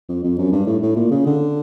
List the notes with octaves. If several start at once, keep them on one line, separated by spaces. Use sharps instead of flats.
F2
F2
F#2
G2
A2
A2
A#2
C#3
D3